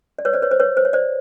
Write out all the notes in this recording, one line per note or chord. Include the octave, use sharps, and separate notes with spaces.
D5
B4 C#5
C5 D5
B4 C#5
C5
B4 C#5
C5
C#5
C5 D5